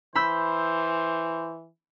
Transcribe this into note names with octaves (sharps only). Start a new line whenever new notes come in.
E3 C5 B5 E6 G6